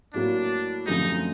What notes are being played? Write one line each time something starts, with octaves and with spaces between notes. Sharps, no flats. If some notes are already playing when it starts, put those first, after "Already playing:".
A2 F#3 A#3 D4
F#2 D3 F3 A3 C4 D#4